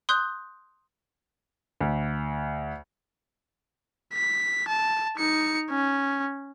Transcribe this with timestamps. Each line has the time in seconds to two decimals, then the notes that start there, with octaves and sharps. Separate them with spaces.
0.09 C6 D#6 F#6 G6 G7
1.81 D2
4.13 B6
4.68 A5
5.17 D#4 C#7
5.70 C#4